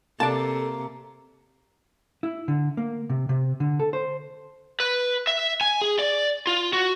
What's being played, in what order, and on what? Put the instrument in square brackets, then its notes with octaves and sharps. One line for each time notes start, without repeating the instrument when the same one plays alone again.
[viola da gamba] C3 [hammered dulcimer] A#3 [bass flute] A4 [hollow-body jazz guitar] D5 A5
[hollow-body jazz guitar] E4
D3
A#3
C3
C3
D3
A4
C5
[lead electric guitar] B4
E5
G#5
G#4
D5
F4
F#4